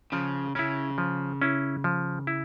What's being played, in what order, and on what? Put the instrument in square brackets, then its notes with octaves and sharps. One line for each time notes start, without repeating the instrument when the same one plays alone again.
[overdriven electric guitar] C#3 [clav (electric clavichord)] F3
[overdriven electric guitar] C#3 [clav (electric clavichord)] C#4 E4
[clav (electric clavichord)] F3
C#4 E4
F3
E4